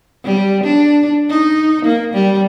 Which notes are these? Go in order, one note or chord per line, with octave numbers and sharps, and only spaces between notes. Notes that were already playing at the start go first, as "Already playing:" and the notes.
G3
D4
D#4
A#3
G3